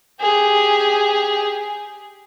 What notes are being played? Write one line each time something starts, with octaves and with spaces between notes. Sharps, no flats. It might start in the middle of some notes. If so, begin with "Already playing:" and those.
G4 G#4